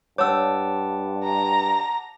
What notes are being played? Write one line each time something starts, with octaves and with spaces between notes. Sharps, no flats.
G2 C#5 F#5 A5 D6 E6
A#5